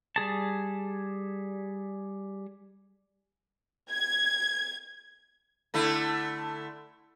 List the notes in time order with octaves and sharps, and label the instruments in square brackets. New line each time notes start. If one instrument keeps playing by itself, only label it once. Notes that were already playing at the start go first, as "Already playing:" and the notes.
[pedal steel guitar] G3 G#4 A5
[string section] G#6
[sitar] D3 A3 E4